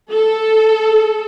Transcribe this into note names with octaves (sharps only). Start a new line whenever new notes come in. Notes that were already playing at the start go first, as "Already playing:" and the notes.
A4